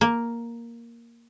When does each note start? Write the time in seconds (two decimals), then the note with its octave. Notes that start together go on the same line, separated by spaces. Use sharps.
0.01 A#3